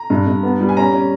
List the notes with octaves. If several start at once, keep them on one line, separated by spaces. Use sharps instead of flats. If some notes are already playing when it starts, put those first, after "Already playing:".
Already playing: A#5
G2
G2
B3
G3
G#5
C#4 A#5
C#4